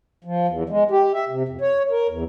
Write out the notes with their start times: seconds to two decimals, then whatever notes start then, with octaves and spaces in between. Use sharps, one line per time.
0.24 F3
0.48 E2
0.69 G#3
0.91 G4
1.13 E5
1.29 C3
1.49 F2
1.61 C#5
1.91 A#4
2.09 E2